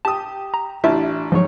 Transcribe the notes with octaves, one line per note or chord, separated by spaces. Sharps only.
G4 A5 D#6
A#5
A1 D4 E4 F4 E5 A5
G#2 F3 F#3 C#5